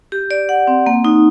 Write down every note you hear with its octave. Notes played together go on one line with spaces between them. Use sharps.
G4
D5
F#5
C4
A#3
D#4